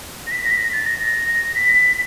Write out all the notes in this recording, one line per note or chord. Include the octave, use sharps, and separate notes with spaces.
A#6
B6
A#6
B6
A#6
A6
A#6
A#6
B6